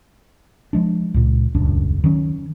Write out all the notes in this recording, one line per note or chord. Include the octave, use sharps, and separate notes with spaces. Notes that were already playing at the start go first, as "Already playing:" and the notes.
F3 G#3 D4
C#2 A#2
D#1 C#2 F#2 D4
D#3 F#3 C#4